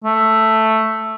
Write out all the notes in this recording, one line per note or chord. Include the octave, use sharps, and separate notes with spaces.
A3